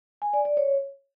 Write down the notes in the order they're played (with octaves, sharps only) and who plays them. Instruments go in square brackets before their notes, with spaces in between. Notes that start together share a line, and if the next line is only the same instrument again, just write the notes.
[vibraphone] G#5
D5
D5
C#5